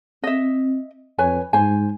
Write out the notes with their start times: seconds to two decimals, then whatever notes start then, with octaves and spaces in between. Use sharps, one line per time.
0.24 C4 D#5 E5
1.18 F2 B4 C#5 G#5
1.53 G#2 C5 G#5